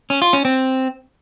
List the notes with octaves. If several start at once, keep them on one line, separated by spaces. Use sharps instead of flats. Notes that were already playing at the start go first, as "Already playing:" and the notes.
C#4
F4
C#4
C4